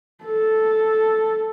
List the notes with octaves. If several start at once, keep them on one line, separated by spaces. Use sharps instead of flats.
A4